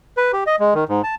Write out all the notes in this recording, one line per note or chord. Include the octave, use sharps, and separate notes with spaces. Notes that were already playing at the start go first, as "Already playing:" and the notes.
B4
G4
D#5
G#3
D#3
G#2
A5